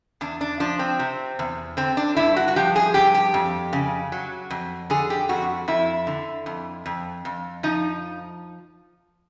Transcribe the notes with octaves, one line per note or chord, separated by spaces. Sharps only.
E2 D4
D4
F3 D4
C4
C3
E2
D3 C4
D4
G2 E4
F#4
F#4
F3 G4
G#4
G2 G4
G4
F2
C#3
F#3
F2
D3 G#4
G4
F2 F#4
F2 E4
D3
F2
F2
F2
F3 D#4